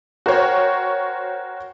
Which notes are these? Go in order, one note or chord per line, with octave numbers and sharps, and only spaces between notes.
F#4 A#4 C5 C#5 G5